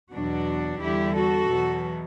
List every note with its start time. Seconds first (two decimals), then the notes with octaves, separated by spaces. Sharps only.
0.13 E2 B2 F#3 D4 F#4
0.81 E2 D3 G3 E4 G4
1.16 F#4 A4
1.50 E2 B2 F#3